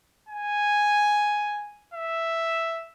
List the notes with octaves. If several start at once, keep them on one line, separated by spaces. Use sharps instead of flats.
G#5
E5